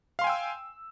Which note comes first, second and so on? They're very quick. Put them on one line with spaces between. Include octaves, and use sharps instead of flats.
F5 C6 G#5 G5 E6